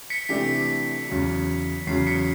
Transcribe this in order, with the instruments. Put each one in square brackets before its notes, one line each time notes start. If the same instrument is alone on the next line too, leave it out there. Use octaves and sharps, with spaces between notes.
[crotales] B6 C#7
[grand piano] C3 E3 A3 D4 G4 [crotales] B6
[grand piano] E2 C#3 F#3
[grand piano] E2 C#3 F#3 [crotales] C7
[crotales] B6 C#7